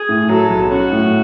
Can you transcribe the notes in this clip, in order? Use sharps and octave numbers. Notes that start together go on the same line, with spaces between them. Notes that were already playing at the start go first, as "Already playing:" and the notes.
Already playing: G#4
A2
F#3 A4
B1
C#4 F#4
A2